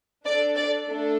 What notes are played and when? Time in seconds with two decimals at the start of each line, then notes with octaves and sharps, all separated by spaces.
0.25 D4 A4 D5
0.55 D5
0.87 A3 D4 A4